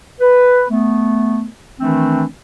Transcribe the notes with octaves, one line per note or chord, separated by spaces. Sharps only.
B4
A3 B3
D#3 E3 A3 C4 D4